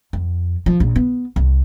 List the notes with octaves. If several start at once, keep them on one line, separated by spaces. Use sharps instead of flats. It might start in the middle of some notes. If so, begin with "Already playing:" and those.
F2
F3
A#1
B3
C2